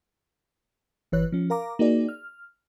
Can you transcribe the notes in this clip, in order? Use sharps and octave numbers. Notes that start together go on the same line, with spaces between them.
G1 E3 B4 C#5 F#6
F3 C#4
A#4 F5 A#5 D6
A#3 D#4 F#4 G#4 D5
F6